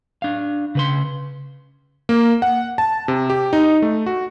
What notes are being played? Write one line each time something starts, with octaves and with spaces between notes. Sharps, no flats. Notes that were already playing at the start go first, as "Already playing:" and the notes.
D4 F5
C#3 B4 C6
A#3
F#5
A5
C3
G4
D#4
A3
F#4